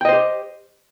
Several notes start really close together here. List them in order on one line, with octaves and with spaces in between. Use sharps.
G5 D#5 C5 G4